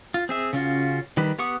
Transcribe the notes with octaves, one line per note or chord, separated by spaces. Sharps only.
F4
C4 G#4 E5
C#3 C#4 F4 F#4
D#3 G3 B4
B3 G4 F#5 C#6 D#6